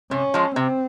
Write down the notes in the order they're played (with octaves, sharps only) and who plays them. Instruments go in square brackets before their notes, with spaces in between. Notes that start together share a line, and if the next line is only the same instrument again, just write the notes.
[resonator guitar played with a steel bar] C3 [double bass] C#4
[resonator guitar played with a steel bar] F3 G#3
[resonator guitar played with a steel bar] C3 [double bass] C4